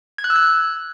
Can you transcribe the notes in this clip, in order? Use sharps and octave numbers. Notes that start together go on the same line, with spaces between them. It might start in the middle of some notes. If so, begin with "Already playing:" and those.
G#6
F#6
E6
F#6